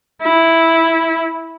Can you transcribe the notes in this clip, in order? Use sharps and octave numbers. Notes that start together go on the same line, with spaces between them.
E4